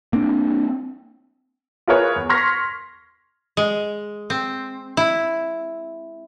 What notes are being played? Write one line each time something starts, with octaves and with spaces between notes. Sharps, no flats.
A#3 C4 D4
F4 G#4 A#4 B4 C#5
E2
C6 C#6 F6 G#6 A#6 B6
G#3
C4
E4